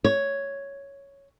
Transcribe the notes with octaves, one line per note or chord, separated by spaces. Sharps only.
C#5